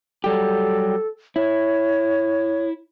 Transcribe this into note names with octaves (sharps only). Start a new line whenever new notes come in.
F#3 G3 G4 A4
E4 C#5